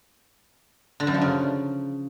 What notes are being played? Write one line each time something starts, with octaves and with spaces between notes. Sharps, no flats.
D3
F#2
F3
C#3